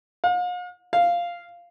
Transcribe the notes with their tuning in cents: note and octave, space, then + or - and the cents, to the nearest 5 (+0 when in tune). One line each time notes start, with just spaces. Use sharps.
F5 +45
F5 -5